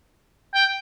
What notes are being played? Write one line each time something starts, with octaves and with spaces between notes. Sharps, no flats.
G5